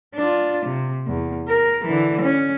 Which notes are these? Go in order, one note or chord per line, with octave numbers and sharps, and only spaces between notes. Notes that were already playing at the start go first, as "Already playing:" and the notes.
D4 F4
C3
E2
A#4
D3 E3
C#4